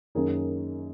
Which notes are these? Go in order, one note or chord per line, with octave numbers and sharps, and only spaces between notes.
F#2 D#3 A#3 C#4 G#4